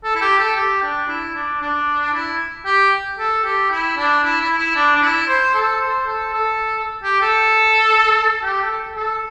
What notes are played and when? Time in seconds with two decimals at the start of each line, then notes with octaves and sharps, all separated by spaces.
0.04 A4
0.16 E4
0.21 G4
0.39 A4
0.56 G4
0.83 D4
1.08 E4
1.35 D4
1.61 D4
2.13 E4
2.65 G4
3.19 A4
3.44 G4
3.71 E4
3.97 D4
4.24 E4
4.41 E4
4.59 E4
4.75 D4
4.95 D4
5.02 E4
5.28 C5
5.54 A4
5.81 C5
6.07 A4
6.33 A4
7.03 G4
7.21 A4
8.43 G4
8.61 A4
8.96 A4